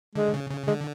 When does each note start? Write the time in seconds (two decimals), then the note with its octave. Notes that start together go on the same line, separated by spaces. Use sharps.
0.15 D3 G#3
0.34 C#3
0.51 C#3
0.68 D3 G#3